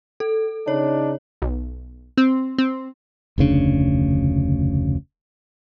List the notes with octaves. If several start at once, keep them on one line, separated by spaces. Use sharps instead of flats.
A4
C#3 D4 D#4 C#5
B1
C4
C4
F1 D2 C#3 D4